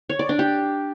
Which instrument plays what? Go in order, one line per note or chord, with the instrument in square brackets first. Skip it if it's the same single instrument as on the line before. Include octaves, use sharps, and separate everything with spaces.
[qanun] C#5
D5
D4
G4